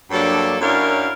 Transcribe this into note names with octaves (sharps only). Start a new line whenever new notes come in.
G2 F#3 A#3 D4 A4
F#2 D4 E4 A#4 C#5 F5